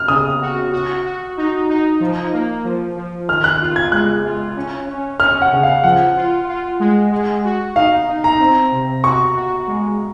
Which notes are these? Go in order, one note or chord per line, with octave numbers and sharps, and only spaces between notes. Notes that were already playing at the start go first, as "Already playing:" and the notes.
Already playing: F6
C#3 D#6
F#4
F#4
F#4
D#4
D#4
F3
A#3
F3
F3
D#3 F6
F#6
F4
G#6
G#3 F#6
F4
C#4
C#4
C#4 F6
F#5
C#3
F5
F3 F#5
F4
F4
G#3
G#3
F#4
D#4 F5
D#4
A#5
C4
C3
F#4 C#6
F#4
G#3